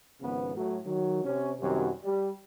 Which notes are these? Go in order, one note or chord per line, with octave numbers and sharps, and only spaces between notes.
G#1 C#3 F3 B3
A2 F#3
D#3 F#3
C3 C#4
F#2 C3 D#3 F#3 G3
G3